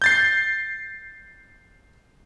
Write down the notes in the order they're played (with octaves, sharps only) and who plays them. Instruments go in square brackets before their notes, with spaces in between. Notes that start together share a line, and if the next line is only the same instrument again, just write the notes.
[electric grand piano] G6 A6 C7